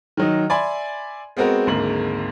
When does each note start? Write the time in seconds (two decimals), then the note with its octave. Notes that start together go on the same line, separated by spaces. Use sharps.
0.17 D#3 F#3 D#4
0.50 D5 E5 G#5 B5 C6
1.37 G#3 B3 C4 F#4 A#4
1.67 G#1 D2 G#2 A#3 F#7